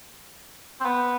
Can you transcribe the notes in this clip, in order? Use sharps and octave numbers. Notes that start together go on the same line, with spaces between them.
C4
B3